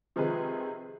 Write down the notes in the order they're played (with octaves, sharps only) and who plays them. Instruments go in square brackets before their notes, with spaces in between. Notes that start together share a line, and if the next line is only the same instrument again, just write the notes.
[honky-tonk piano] C3 D#3 F3 G#3 G#4 B4